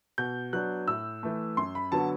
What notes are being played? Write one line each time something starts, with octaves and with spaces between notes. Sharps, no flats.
B2 G6
F#3 B3 D4 F#6
A2 E6
E3 A3
F#2 C6
B5
D3 F#3 B3 A5